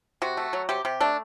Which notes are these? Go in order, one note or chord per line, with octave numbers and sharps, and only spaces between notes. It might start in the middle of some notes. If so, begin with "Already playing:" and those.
C3 F#4
A3
F#3
C3 G4
C3 G4
A3 D4